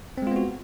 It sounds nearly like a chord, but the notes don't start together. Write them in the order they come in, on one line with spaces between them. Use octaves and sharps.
C4 G#3 F4 B3 F#4